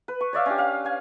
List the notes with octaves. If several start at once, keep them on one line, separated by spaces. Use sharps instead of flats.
B4
C#6
C#5 D5 E5 F5
C#4 D4 G4
F5
F5 G#5